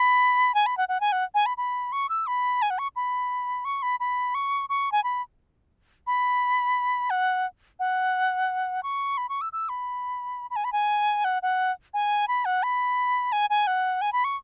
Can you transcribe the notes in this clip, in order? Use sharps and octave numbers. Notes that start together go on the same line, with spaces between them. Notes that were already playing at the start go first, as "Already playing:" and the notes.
Already playing: B5
G#5
B5
F#5
F#5
G#5
F#5
G#5
B5
B5
C#6
E6
B5
G#5
F#5
C#6
B5
C#6
B5
B5
C#6
C#6
G#5
B5
B5
F#5
F#5
C#6
B5
C#6
E6
E6
B5
B5
G#5
B5
G#5
F#5
F#5
G#5
B5
F#5
B5
G#5
G#5
F#5
G#5
B5
C#6